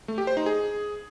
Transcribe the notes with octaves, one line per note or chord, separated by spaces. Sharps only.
A3
G4
C5
D#4
G#4